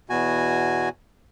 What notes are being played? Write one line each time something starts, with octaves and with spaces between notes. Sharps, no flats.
E2 B2 F#4 G#5